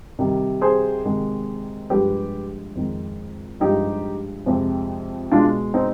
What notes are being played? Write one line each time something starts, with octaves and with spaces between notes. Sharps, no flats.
C3 D#3 G3
G#4 C5
C3 D#3 G#3
G2 F3 G#3 G4 B4
F2 D#3 G#3
G2 F3 G#3 D#4 G4
F2 C3 F3 G#3
B2 G#3 D4 F4
C4 D#4